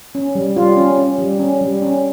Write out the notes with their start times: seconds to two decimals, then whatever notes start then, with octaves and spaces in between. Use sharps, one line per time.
0.15 C#4
0.35 G3
0.56 G3 F4
0.77 C#4
0.98 C#4
1.19 G3
1.39 C#4
1.61 G3
1.82 C#4